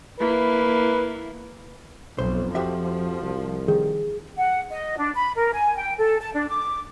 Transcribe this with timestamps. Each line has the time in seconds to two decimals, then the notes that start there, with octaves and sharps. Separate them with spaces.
0.20 A#3 E4 B4
2.19 B1 F2 C5
2.55 F3 F#4 G4 E5
3.22 C2
3.68 D#3 G#4
4.38 F#5
4.71 D#5
4.97 D4
5.14 B5
5.36 A#4
5.52 G#5
5.77 G5
5.98 A4
6.21 A5
6.34 D4
6.49 D6